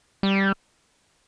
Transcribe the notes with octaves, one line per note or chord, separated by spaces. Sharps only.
G3